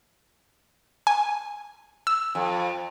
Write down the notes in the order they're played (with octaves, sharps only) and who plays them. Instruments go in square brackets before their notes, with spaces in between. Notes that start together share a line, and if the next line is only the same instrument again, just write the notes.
[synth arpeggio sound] G#5
E6
[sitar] F2